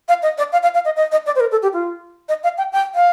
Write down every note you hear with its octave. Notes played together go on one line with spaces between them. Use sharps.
F5
D#5
D5
F5
F5
F5
D#5
D#5
D#5
D5
C5
A#4
A4
G4
F4
D#5
F5
G5
G5
F5